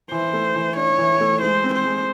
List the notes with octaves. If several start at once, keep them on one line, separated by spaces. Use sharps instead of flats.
E3 C5
A3
E3
D4 C#5
E3
A3
G#3 C5
C4
C5
G#3